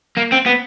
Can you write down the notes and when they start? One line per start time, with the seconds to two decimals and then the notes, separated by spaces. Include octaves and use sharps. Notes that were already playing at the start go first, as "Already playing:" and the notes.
0.17 A#3
0.32 C4
0.46 B3